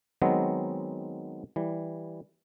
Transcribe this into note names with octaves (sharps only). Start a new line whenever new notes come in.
D#3 F#3 G#3 B3 C4
E3 G3